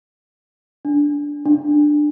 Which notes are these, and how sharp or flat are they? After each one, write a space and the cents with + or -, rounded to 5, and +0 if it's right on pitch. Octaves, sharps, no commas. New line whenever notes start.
D4 -10
D4 +15